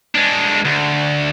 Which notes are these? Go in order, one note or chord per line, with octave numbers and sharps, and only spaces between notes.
G#3 D4
D2